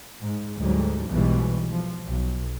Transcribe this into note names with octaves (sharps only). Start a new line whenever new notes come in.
G#2
D2 G#2 D3 F#3 G3
B1 E2 G#2 B2 E3 G3
F3
B1